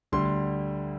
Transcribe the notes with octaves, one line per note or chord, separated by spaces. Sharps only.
D2 D3 G3 C6